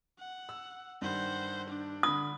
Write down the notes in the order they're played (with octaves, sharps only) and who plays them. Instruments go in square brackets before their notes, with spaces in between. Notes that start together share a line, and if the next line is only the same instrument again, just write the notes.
[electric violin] F#5
[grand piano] E6
[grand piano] G2 D#3 G3 [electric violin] C5 F#5
[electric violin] D4
[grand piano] D3 B5 [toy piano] D#6